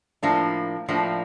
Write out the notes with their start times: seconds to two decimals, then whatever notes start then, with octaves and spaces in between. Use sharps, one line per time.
0.23 A2 F3 A#3 D4
0.88 A2 F3 A#3 D4